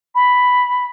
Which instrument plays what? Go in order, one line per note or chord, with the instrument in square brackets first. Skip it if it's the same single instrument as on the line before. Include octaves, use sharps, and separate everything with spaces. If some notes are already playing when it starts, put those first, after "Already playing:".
[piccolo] B5